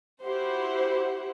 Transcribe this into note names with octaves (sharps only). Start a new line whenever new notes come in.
E4 F#4 G4 C5 F#5